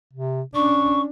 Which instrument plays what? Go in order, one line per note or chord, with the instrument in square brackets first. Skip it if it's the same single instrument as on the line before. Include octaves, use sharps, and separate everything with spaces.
[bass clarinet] C3
[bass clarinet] C#4 [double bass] D4 [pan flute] C#6